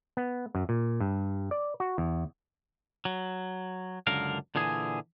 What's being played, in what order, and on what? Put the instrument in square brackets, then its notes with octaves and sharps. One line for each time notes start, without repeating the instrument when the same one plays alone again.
[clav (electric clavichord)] B3
F#2
A#2
G2
D5
F#4
E2
[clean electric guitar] F#3
C#2 F#2 D3 A#4 F5
A#2 D3 E3 G#4